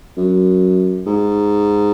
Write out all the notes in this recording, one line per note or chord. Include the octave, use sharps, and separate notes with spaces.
F#2
G#2